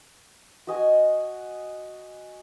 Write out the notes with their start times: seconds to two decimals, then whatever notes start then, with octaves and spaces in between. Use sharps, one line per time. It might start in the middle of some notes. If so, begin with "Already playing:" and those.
0.67 F#4 D#5 G#5